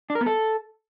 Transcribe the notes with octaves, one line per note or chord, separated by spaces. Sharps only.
D4
A#4
B3
A4